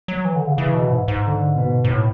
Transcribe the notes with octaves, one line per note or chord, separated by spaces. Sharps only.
F#3
E3
D3
C#3
C#3 E3
B2
G#2
G#2
D3
B2
G#2
A2